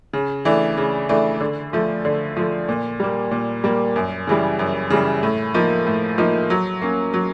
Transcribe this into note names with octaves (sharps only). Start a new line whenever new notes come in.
C#3
E3 A3 D4
C#3
E3 A3 D4
D3
F3 A3
D3
F3 A3
A#2
G3 A#3
A#2
G3 A#3
F#2
C#3 E3 G3
F#2
C#3 E3 G3
A2
F3 A#3 D#4
A2
F3 A#3 D#4
F#3
A#3 C#4
F#3